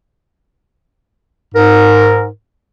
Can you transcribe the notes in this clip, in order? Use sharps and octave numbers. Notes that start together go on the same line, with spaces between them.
G#2 A#4